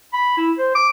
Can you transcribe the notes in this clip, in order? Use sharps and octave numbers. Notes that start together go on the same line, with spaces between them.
B5
E4
C5
D6